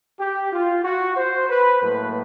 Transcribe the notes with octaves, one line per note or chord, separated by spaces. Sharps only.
G4
F4
F#4
C5
B4
A2 F#3 A#3 B4